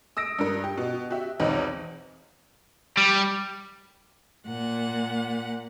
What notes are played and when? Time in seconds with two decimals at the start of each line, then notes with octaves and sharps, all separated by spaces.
0.17 D#6 E6 A#6 D7
0.39 G2 A#4
0.64 G4
0.78 B2
1.10 F#4 G4 E5
1.40 B1 E2 C4 D#4 B4 D#5
2.97 G3
4.46 A#2 F#5